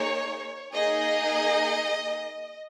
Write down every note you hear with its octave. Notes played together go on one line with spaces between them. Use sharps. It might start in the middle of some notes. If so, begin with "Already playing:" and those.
Already playing: A#3 D#4 G#4 C#5
A#3 D#4 G#4 D#5